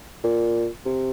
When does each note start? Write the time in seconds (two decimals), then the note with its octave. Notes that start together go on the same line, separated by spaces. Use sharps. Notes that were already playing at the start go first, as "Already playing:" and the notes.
0.24 A#2
0.85 C3